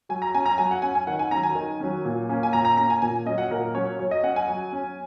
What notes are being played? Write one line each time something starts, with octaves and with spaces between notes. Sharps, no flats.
F#3 G#5
A#5
C#4 G#5
A#5
F#3 G#5
F#5
C#4 G#5
G#5
D#3 F#5
G#5
F#3 C#4 A#5
G#5
D#3
F#3 C#4
A#2
A#3 C#4
G#5
A#2 A#5
A#5
A#3 C#4 A#5
G#5
A#2 G#5
F#3 C#4 D#5
F#5
A#2 A#4
F#3 C#4 C#5
F#3 C#5
D#5
C#4 F#5
G#5
F#3
C#4